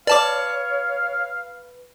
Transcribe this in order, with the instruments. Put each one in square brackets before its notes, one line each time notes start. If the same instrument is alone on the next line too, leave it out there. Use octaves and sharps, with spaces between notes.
[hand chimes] B4 [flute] C#5 [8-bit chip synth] D5 A5 D6 [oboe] F5